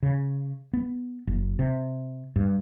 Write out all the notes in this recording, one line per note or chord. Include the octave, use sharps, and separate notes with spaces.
C#3
B3
F#1
C3
G2